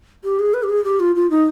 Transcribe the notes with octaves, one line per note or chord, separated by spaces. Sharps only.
G4
G#4
B4
G4
G#4
G4
F4
F4
D#4